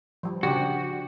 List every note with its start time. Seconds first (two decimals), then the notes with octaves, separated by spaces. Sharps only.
0.23 F3 G3
0.43 C#3 D4 F#4 G4